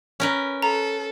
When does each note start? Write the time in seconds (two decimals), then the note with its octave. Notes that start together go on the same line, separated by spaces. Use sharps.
0.20 C#4 A#4 B4
0.62 A4 A#5